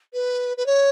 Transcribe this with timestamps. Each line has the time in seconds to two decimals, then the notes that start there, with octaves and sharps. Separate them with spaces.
0.14 B4
0.57 B4
0.66 C#5